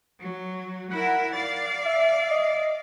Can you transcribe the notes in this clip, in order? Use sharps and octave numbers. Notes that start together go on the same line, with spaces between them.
F#3
E4 A#4 F#5
D5 F5 A6
E5
D#5